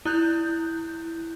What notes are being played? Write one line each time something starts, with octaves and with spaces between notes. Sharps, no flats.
E4 F#6 G6